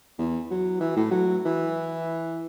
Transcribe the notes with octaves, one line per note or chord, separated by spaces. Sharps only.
E2
F#3
E3
A2
F#3
E3